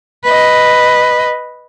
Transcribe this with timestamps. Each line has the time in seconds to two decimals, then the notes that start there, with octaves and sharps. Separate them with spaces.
0.24 B4 D#5